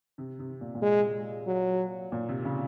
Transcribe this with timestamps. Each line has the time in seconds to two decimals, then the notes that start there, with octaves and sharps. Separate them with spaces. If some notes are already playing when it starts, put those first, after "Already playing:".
0.18 C3
0.39 C3
0.61 A#2
0.75 A#2
0.82 G#3
1.47 F#3
2.12 A#2
2.29 C3
2.45 C#3